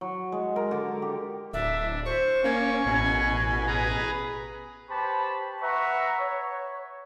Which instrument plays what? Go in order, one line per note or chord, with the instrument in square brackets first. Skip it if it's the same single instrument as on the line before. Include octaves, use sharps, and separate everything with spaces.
[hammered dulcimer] F#3
G#3
A#4
D3
G4
[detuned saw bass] D1 [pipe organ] D4 [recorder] E5
[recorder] C5 [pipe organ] C#6
[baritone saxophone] A#3 [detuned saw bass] C#4 [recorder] G#5
[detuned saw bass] A1 [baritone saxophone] B2
[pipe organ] G#4 B4 A#5
[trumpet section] G4 B4 C5 A5 B5 C#6
B4 E5 F#5 A#5 C#6
C#5